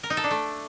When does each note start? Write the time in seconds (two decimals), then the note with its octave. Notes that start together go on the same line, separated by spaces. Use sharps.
0.03 A#4
0.10 D#4
0.17 A4
0.24 D4
0.31 A3